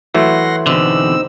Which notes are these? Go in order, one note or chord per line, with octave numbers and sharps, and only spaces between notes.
E3 F#3 A3 F#5 C6 A#6
E2 B2 D3 C4 D#4 E6